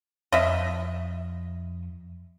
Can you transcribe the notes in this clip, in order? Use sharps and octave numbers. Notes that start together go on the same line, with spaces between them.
F2 D#5 E5